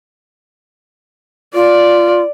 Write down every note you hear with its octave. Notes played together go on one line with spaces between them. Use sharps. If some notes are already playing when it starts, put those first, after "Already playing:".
F4 D5